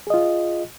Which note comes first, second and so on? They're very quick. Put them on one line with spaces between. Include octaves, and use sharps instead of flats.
G#4 D#5 F4